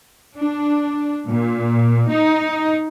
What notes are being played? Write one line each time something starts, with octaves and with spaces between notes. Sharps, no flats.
D4
A#2
D#4